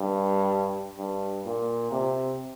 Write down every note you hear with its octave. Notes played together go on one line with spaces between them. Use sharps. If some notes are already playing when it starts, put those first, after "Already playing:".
Already playing: G2
G2
A#2
C3